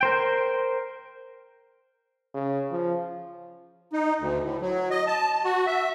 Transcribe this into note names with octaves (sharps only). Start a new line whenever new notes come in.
A#4 C5 G5
C#3
F3
D#4
D2
A2
F#3
D#5
A5
F#4
E5